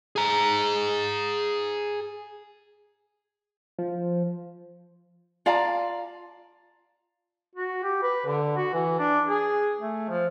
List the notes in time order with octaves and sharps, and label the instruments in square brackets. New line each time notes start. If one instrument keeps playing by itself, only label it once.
[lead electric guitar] G#4 A#5
[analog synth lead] F3
[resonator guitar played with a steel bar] F4 D5 F5 A5 A#5
[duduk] F#4
G4
B4
D3
F#4
E3
D4
G#4
A3
F3